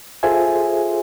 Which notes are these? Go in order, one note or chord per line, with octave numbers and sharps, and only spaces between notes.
F4 G#4 A4 C5 E5 G#5